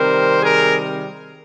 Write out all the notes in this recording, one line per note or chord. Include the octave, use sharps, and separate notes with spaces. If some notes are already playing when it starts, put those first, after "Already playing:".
Already playing: C3 D#3 G3 A#4 C5
G#4 A#4